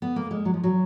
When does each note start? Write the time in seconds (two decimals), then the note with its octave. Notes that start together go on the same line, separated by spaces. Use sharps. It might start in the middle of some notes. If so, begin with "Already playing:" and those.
0.02 B3
0.16 A#3
0.31 G#3
0.45 F#3
0.54 F3
0.64 F#3